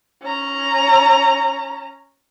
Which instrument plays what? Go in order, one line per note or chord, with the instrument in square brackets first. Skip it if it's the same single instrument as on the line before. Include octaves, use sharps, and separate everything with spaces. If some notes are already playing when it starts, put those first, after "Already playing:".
[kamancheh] C#4 A#5